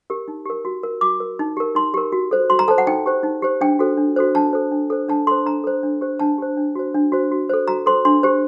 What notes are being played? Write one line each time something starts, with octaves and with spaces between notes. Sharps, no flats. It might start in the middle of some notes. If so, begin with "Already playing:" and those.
G4 A#4
D#4
G4 A#4
F#4
A#4
F#4 D6
A#4
D#4
G4 A#4
D#4 C6
G4 A#4
F#4
A4 C5
F#4 C6
A#5
A4 C5 A5
F#5
D#4 G5
G4 C5
D#4
G4 C5
D4 G5
F#4 A4 C5
D4
F#4 A4 C5
D4 A5
A4 C5
D4
A4 C5
D4 A5
A4 C5 C6
D4 A#5
A4 C5
D4
G4 C5
D4 A5
G4 C5
D4
F#4 C5
D4
F#4 C5
F#4
A4 C5
F#4 A#5
A4 C5 C6
D4 C6
G4 C5